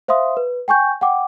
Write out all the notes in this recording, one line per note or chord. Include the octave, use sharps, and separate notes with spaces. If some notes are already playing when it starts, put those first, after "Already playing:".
C5 E5 F5 C6 D#6
B4
G5 G#5 C#6 G6
F#5 G5 D6